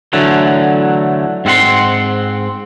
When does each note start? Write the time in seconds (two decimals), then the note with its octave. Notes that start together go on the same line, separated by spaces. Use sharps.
0.13 D3 E3 F#3 A3
1.45 G#2 C4 E4 F#5 C6